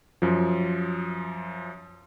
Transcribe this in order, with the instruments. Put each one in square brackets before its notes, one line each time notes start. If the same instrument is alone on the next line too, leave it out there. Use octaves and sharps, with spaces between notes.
[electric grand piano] F#2 F3